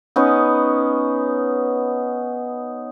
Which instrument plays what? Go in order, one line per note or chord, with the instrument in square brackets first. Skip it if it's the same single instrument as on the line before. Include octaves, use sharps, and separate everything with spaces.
[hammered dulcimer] B3 C#4 D#4